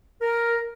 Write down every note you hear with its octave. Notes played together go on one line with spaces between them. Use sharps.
A#4